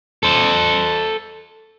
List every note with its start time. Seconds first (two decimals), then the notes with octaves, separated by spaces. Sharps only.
0.23 A4 C5